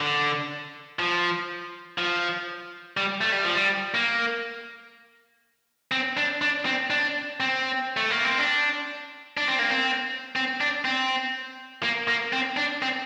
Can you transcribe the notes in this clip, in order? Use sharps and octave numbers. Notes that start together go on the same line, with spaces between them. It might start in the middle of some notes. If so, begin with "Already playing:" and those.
D3
F3
F3
G3
A3
G3
F3
G3
A#3
C4
D4
D4
C4
D4
C4
A3
A#3
C4
D4
D4
C4
A#3
C4
C4
D4
C4
A#3
A#3
C4
D4
C4